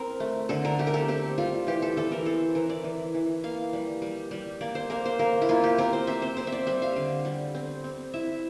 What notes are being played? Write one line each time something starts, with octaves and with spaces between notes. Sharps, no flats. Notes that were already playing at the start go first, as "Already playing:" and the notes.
Already playing: C4 A#4
A3
D3 A4
A#4
A3 G4
A#4
A4
C4 G4
G3 F4
E3 G4
A4
E3 A4
A#4
C4 A4
E3 A#4
D5
E3
E3
A#3 F5
G3
G3
G3
A#3 D5
C5
A#3 A#4
C5
A#3 A#4
E4
A#3 F4
G4
C4 A#4
C5
C4 E5
C5
C4 C5
E5
D5
G3 E5
F5
D3
G3
C4
C4
E4 E5